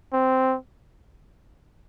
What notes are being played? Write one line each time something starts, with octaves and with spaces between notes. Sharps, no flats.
C4